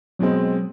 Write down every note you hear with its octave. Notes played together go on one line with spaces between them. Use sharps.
B2 F#3 G#3 C4